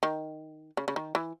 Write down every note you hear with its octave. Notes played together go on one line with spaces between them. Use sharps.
D#3
C#3
C#3
D#3
E3